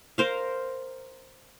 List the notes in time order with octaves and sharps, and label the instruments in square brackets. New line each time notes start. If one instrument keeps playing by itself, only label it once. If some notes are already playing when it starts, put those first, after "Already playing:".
[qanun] A#4 C5 F5